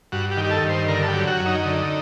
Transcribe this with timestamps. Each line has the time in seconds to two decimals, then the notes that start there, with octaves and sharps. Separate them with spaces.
0.12 G2 F#4
0.31 G4
0.37 D#3
0.45 G4
0.51 A4
0.63 G2
0.69 C5
0.88 D3 A#4
1.03 A4
1.08 G4
1.13 F#3
1.27 F#4
1.40 F#2
1.46 D#4
1.66 D3